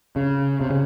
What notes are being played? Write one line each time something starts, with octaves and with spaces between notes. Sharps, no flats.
C#3
C3
C#3